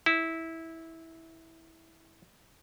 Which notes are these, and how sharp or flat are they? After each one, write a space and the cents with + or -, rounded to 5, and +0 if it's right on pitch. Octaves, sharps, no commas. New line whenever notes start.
E4 -15